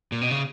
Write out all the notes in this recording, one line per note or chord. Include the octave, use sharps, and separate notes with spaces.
A#2
B2
C#3